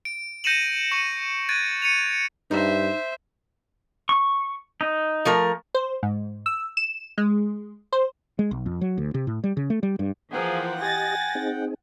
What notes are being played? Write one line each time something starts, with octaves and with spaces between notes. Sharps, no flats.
D7
G6 A#6 C#7 D#7 E7 F#7
C#6 C#7 D#7 F#7
F#6 G#6 A6 D7 D#7
C#7 D#7 F7
G2 D#4 C5 E5
C#6
D#4
F3 A3 A#4
C5
G#2
E6
E7
G#3
C5
G#3
B1
F2
F#3
D2
C3
A2
G3
C#3
A3
G3
G2
E3 F3 A#3 G#4 F#5 G5
G4 D#5 G#5 A6 A#6
C4 D#4 G#4